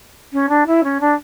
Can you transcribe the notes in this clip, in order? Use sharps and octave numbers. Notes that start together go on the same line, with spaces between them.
C#4
D4
E4
C#4
D4